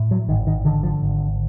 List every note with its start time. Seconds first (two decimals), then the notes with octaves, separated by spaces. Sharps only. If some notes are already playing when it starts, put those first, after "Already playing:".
Already playing: A2
0.11 F#3
0.28 G#1 D#3
0.47 D#3
0.65 D3 D#3
0.83 F3
1.02 G#1